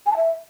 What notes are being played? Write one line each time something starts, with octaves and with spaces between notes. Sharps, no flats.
G#5
A5
E5